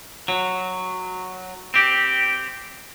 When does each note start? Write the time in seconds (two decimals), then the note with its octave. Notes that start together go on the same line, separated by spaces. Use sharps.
0.28 F#3
1.74 C4 G4